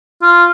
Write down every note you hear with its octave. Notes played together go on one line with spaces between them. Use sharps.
F4